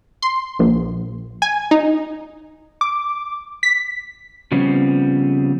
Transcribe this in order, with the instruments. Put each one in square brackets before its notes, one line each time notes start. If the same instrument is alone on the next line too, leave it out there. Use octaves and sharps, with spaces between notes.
[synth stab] C6
A#1
G#5
D#4
[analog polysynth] D6
B6
[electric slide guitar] C#3 F3 G3 B3 C4